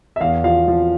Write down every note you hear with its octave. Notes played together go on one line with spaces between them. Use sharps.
E5
E2 F5
F3 F5
F3